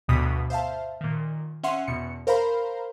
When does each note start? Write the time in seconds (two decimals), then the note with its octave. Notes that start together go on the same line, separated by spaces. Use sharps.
0.08 D2 G2 B2 D#6 B6
0.50 C5 E5 F5 A5
1.01 A#2 D#3
1.63 C#4 E5 F#5 C6
1.87 E2 B2 C#7
2.27 A#4 C5 F5 A#5 B5